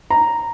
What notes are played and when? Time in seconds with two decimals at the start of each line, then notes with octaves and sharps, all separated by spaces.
0.10 A#5